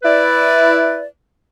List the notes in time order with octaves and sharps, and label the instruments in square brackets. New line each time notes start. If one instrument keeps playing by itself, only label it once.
[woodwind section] E4 B4 D5